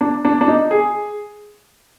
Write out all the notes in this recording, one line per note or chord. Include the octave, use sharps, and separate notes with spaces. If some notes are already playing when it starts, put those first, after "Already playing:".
D4
D4
D4
D#4
G#4